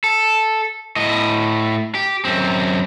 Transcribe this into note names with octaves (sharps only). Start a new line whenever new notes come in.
A4
A2 D#5
G4
F#2 C4